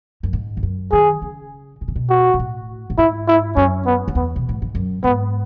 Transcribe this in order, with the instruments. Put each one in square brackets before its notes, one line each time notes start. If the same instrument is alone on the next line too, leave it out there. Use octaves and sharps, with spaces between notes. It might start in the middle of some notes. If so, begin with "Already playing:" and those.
[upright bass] F#2
G#2
E2
F#2
[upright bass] D#3 [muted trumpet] G#4
[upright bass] C#3
B2
C#3
B2
[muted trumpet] F#4
[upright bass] B2
A2
A2
[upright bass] G#2 [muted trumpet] E4
[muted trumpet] E4
[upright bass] F#2 [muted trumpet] C#4
[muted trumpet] B3
[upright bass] F#2
[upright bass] E2 [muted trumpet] B3
[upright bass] B2
A2
G#2
F#2
[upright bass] G#2 [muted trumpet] B3